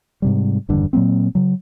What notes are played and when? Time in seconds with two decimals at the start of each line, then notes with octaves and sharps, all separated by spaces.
0.22 G#2 C3 G3
0.69 F#1 E2 G2 D3
0.93 A#2 F#3 A#3 C4
1.35 C#3 F#3